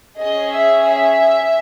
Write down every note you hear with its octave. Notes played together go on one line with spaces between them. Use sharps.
C#4 G#4 D#5
E5
E5